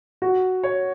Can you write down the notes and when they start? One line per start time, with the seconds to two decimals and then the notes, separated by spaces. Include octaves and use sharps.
0.22 F#4
0.63 C#5